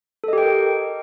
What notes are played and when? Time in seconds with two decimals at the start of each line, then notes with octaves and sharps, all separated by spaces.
0.24 A4
0.28 D#5
0.33 G4
0.38 G5
0.42 A#4